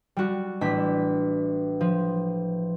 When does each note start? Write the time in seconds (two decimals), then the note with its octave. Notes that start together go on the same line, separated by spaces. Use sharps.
0.16 G3 F#4
0.61 A1 A3 D4 B6
1.81 F3